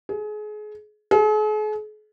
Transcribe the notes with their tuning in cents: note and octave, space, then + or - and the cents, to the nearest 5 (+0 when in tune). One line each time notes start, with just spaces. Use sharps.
G#4 +30
G#4 +45